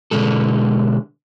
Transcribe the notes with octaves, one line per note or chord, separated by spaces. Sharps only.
B2 D3 G#3 A4